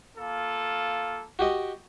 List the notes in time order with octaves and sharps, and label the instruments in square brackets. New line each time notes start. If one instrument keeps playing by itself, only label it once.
[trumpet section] A#3 F4 A4
[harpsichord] F#4 G4 D#5